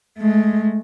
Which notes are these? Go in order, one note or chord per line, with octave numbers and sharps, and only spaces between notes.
G#3 A3